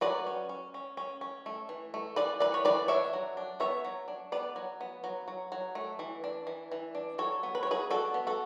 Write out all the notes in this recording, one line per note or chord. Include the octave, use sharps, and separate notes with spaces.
F#3 B4 D5
C#4
C#4
C#4
C#4
C#4
A3
E3
A3
E3 B4 D5
E3 B4 D5
C#5
E3 B4 D5
D4 C#5 E5
F#3
D4
B3 C#5 E5
F#3
D4
B3 B4 D5
F#3
B3
F#3
F#3
F#3
A3
E3
D4
E3
E3
D4
F#3 A4 C#5
B3
B4
C#5
F#3 G#4 B4
D4 F#4 A4
B3
F#4 A4